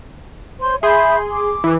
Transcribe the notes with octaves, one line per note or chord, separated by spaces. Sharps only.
C5 C#5 C6
G#4 E5 B5 C6 G6
D6
E3